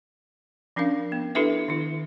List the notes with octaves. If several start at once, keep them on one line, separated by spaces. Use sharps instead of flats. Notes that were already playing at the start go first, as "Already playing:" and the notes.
F3 C#4 D4 A#4 F5
B3
D4 E4 G4 A4 B4 E5
D#3 E4